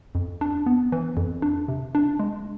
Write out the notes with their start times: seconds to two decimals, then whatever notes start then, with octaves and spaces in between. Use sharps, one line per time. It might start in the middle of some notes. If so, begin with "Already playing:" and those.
0.15 F2
0.41 D4
0.66 B3
0.92 E3
1.17 F2
1.42 D4
1.68 C3
1.95 D4
2.19 G#3